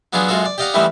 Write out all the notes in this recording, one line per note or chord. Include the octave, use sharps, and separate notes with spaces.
F#3 B3 D4 F4 G#4
F#2 G#3 F4 F#4 A4
D5
G4 D5 D#5 F5 F#5 A#5
D#3 E3 G3 A3 B3 C4